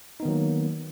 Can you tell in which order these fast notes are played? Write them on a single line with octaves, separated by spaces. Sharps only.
D#4 B3 D#3 F#3 A#3